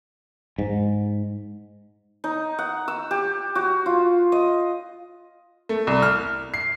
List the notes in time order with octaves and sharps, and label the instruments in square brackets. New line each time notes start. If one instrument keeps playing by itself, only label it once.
[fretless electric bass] G#2
[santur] D#4
F#5
E6
G4
F#4
F4
D#5
[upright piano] A3
C2
F6
C7